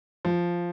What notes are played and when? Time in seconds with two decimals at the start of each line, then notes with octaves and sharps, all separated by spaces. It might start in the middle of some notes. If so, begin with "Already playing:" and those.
0.25 F3